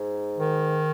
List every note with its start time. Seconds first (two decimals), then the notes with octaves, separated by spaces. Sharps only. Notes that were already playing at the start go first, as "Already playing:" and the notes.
Already playing: G#2
0.38 D#3